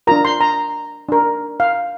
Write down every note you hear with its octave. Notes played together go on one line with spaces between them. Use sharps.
D4 F4 A#4 A#5
C6
A#5
D4 A#4
F5